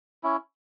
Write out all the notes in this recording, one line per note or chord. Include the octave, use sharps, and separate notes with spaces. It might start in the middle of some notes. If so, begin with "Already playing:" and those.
C#4 E4